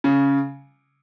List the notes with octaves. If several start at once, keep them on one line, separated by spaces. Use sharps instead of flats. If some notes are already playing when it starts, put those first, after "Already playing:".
C#3